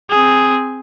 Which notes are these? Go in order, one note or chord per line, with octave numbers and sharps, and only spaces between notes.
C4 G#4